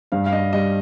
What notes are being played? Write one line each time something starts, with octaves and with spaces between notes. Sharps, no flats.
G2 F5
F5
D4 D#5
G3 D#5